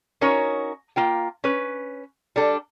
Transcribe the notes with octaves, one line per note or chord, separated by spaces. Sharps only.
C#4 D#4 F#4 A#4 C#5
A#3 F4 G5
C#4 B4
G3 D4 A4